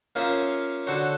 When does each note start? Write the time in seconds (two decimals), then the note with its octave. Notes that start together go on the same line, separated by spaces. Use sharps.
0.16 A#3 C#4 F4 G#4 C5 E5
0.87 D3 F#4 A4 C5 C#5